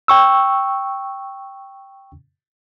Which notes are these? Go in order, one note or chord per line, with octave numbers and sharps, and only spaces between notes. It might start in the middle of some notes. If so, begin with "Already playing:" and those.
G5 C#6 E6